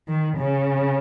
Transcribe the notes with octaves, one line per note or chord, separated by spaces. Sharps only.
D#3
C#3